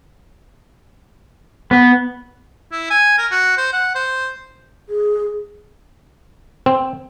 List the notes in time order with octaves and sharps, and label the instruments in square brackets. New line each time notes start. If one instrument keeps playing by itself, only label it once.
[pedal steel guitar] B3
[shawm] E4
G#5
A#4
F#4
C5
F#5
C5
[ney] G#4
[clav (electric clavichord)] C4